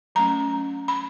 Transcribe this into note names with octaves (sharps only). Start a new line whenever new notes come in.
F#3 A3 C#4 A#5
B5